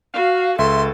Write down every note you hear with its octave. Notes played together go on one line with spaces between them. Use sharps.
F#4 F5
C#2 A4 E5 C6